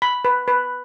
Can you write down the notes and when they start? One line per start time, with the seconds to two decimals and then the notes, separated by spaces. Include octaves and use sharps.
0.02 B5
0.25 B4
0.48 B4